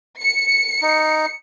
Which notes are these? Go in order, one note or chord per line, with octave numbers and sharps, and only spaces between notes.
C#7
D#4